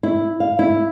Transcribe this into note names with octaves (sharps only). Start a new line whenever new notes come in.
E4
F5
E4